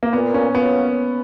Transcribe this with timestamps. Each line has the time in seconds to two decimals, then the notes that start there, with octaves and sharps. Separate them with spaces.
0.03 A#3
0.13 A#2 B3
0.34 C#4
0.54 F#3 B3 C#4 F4